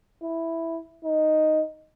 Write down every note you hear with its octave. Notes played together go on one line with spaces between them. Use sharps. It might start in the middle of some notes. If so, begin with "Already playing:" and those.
E4
D#4